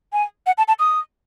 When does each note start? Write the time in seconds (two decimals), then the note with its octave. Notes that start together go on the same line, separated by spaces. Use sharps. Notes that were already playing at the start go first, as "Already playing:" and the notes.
0.13 G#5
0.46 F#5
0.58 A5
0.68 A5
0.79 D#6